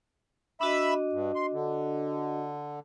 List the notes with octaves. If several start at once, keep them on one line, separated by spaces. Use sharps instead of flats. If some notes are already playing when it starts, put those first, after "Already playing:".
D4 F#4 D#5 E5 B5 E6
G2
C6
D3